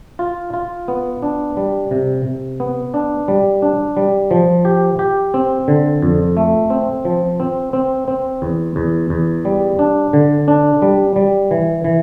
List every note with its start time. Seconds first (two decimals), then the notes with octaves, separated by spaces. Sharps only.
0.19 F4
0.54 F4
0.88 B3
1.23 D4
1.57 G3
1.91 C3
2.25 C3
2.60 B3
2.94 D4
3.28 G3
3.62 D4
3.97 G3
4.31 F3
4.65 G4
4.99 G4
5.34 C4
5.68 D3
6.02 F2
6.37 A3
6.70 C4
7.05 F3
7.40 C4
7.73 C4
8.08 C4
8.42 E2
8.76 E2
9.10 E2
9.45 G3
9.79 D4
10.13 D3
10.48 D4
10.82 G3
11.16 G3
11.51 E3
11.84 E3